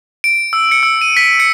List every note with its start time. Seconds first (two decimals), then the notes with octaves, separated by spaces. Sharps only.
0.24 D7
0.53 E6
0.72 C#7
0.83 E6
1.01 D#7
1.17 B6
1.40 C#7